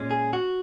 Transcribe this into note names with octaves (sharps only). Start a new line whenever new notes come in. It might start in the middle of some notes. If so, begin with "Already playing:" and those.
Already playing: A#2 G#3 C#4
G#4
F#4